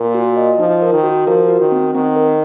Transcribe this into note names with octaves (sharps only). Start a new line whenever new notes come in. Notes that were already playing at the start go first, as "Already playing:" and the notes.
Already playing: A#2 A#4
F#4
D#5
F3 D#4
A#4
D#3
F#4
F3 A#4
F#4
D#3
C4
D#3 C4
A#4